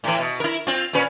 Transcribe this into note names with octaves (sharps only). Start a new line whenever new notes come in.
A2 E3
B2
E4 A#4
C4 F4
A#2 C#4 B4